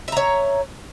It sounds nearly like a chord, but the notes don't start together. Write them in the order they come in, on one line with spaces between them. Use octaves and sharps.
E5 A#5 C#5